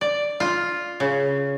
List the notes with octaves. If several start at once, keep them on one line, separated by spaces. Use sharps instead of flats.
D5
F4
C#3